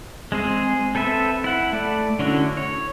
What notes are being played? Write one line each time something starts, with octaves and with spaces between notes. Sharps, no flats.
G#3 C4 G#4
C4 A4 B4 E5
E4 F#5
A3 D5
D3 C#4 D4 E4 F#4
C#5